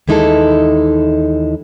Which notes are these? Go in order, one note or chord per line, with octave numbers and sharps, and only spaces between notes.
D#2 E3 G#3 D#4 E4 A4